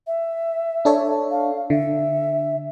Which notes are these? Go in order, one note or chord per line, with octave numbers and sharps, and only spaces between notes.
E5
D4 A4 C#5
F5
D3 E5